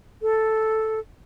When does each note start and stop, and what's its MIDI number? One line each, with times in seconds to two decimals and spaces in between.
0.22 1.00 69